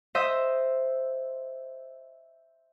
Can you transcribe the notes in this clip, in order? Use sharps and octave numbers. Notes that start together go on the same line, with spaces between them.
C5 D#5 E5